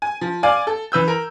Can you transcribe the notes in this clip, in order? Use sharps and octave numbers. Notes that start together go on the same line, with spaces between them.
G#5
F3
D5 F5 G#5
A4
E3 B4 E6 G6
A#4